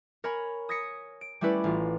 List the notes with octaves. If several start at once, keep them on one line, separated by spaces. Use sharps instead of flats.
A#4 C#5 G#5 B5
D#6 G#6 A#6 B6 C#7 D#7
D7
G3 A3 C#4 E4 B4 D5
A1 F4